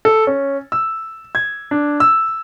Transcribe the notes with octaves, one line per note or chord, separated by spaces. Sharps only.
A4
C#4
E6
G#6
D4
E6